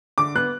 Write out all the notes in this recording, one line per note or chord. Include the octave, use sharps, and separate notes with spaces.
D3 D6
B3 F#6